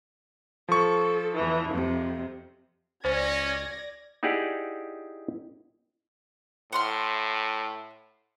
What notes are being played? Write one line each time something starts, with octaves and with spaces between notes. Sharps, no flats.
F3 A4 C#6
E2 E3
F2 C3
C#2 C#4 C5 D5 G#6 A#6
D#4 E4 G4 G#4 D5 F#5
A2 F#5 C6 F6